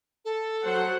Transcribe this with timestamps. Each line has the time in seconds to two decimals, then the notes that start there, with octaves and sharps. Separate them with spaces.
0.25 A4
0.63 F#3 C5 F#5